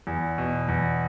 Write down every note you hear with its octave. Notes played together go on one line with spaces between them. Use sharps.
E2
B2
E2